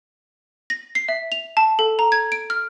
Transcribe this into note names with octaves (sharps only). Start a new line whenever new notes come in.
A#6
C7
E5
F7
A5
A4
A#5
G#6
D7
F6